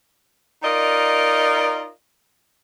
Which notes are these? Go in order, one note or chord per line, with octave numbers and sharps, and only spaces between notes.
D#4 F4 A#4 D5 D#5